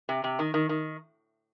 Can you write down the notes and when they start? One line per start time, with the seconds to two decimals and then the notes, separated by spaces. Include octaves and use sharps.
0.09 C3
0.24 C3
0.39 D#3
0.54 D#3
0.69 D#3